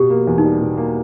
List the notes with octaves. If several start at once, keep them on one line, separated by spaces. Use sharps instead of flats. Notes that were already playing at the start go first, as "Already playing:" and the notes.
Already playing: B2 G4
A#3
E2
D#4
G3
B2
A#3